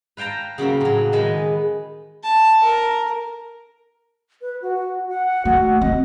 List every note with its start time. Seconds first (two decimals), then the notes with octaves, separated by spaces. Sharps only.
0.17 B4 F5 G5 A5 A#5
0.58 C#3 F#3 A#3 C4
0.81 A2 F#3
1.12 D#3 G#3 B4 D#5
2.23 A5
2.63 A#4
4.42 B4
4.62 F#4
5.09 F#5
5.45 A3 F#4
5.81 C4 D#5